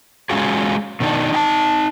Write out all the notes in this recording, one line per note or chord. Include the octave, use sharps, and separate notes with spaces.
G#3 C#4 F4 F#4 G#4
B2 D#3 D4 D#4
D#4 G5 A5